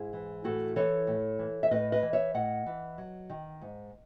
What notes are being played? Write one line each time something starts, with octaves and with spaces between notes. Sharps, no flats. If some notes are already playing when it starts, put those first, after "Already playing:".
Already playing: G#2 E4 G#4
E3
A2 F#4 A4
E3 A4 C#5
A2
E3
E5
A2 B4 D#5
B4 D#5
E3
C#5 E5
A2 D#5 F#5
E3
F#3
D#3
G#2